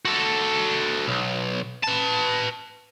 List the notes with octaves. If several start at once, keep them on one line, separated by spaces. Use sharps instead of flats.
F#4 A4
B1
B4 A5